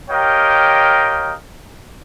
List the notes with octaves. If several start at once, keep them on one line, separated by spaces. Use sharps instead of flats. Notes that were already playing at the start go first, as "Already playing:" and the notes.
G4 A#4 C#5 D#5 F5 G5